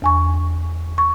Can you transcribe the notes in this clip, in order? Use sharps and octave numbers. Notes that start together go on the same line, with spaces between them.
E2 G#5 C#6
C#6